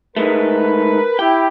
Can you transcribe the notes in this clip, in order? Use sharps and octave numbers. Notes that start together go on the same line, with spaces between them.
G#2 G#3 A3 A#4 B4
E4 G4 G5